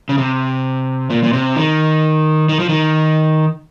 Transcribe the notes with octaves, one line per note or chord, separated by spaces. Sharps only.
C#3
C3
A#2
A#2
C3
D#3
D#3
F3
D#3